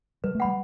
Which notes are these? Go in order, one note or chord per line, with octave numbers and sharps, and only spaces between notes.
G3 B4
A3
G3 F#5 B5